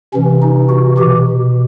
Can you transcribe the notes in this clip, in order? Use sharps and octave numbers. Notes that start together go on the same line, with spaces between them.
C3 E3 C#4
D#4
F#4
B2 G4